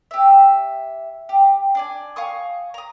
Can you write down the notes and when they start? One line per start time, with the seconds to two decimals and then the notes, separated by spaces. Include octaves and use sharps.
0.11 G4 E5
1.29 G4
1.75 D4 D5 G#5
2.16 F5 G#5 C#6 D#6
2.74 A#5 D#6